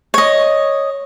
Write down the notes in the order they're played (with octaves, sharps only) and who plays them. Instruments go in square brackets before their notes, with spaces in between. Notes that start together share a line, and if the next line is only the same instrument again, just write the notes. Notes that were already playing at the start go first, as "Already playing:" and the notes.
[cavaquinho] C#5 D#5